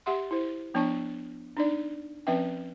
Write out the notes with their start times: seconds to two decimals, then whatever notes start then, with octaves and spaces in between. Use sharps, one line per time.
0.06 G4 E5 F#5 C6
0.31 E4 C5
0.74 F3 B3 D4 C#5 A5 C#6
1.57 D4 D#4 D5
2.27 F3 C4 C#4 B4 E5 G5